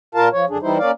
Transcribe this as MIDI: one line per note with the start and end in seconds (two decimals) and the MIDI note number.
0.15 0.28 46
0.15 0.28 65
0.15 0.28 70
0.15 0.28 77
0.15 0.28 81
0.33 0.45 53
0.33 0.45 73
0.49 0.58 42
0.49 0.58 50
0.49 0.58 62
0.49 0.58 68
0.62 0.78 52
0.62 0.78 55
0.62 0.78 63
0.62 0.78 64
0.62 0.78 72
0.78 0.91 58
0.78 0.91 61
0.78 0.91 74
0.78 0.91 77